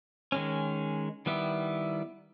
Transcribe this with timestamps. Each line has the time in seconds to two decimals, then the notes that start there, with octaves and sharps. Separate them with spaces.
0.32 D#3 G#3 C#4
1.26 D#3 G3 B3 E4